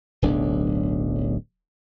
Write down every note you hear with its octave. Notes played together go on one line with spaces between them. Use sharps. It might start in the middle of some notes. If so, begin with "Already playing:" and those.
D1 B1 D4